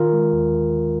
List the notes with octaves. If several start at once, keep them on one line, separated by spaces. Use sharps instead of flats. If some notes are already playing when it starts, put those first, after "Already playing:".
Already playing: D#3 F4 A#4
G#3
D#2
D#2
D#3